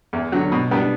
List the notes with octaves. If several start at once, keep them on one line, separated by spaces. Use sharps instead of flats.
E2
D3 F#3
B2
G3 B3 D4